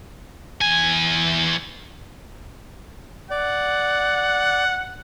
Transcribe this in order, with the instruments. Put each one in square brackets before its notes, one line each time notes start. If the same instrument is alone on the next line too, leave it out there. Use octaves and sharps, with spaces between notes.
[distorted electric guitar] E2 G#5
[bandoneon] D5 [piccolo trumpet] F#5